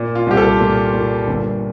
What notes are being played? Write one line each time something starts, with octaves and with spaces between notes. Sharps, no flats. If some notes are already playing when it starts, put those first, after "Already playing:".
Already playing: A#2
F4
C2 G4
A4
A#2
A#2
G1